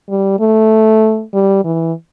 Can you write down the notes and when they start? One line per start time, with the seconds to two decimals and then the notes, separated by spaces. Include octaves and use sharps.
0.09 G3
0.39 A3
1.34 G3
1.64 E3